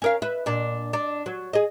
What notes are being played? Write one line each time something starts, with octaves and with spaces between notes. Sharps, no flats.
C#4 A#4 F5
B4 E5
A#2 D4
D4
F#3
G#4 D#5